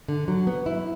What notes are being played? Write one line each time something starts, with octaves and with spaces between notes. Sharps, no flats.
D3
F#3
B3
E4